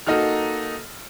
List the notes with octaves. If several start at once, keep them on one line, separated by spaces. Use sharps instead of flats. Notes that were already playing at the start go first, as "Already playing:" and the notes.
A#3 D#4 F#4 A4 F6